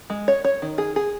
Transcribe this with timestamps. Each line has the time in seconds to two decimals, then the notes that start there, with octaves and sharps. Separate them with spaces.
0.10 G#3
0.28 C#5
0.44 C#5
0.62 D#3
0.78 G#4
0.96 G#4